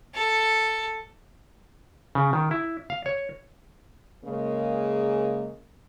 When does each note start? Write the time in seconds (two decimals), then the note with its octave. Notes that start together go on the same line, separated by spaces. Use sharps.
0.14 A4
2.15 C#3
2.33 D#3
2.51 E4
2.90 F5
3.06 C#5
4.25 C#3 G#3 A#3